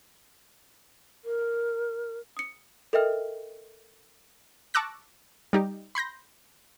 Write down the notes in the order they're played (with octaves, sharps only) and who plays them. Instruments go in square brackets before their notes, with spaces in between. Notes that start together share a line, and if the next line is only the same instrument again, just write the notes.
[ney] A#4
[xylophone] D#6 C#7
A4 A#4 D#5 E5 G5 F6
[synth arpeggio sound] A5 C#6 D6 E6 F#6 A#6
G3 D#4 G4
B5 C6 G6 A#6